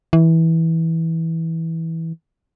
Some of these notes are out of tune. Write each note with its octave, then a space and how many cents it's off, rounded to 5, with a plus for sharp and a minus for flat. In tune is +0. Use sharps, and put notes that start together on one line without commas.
E3 -15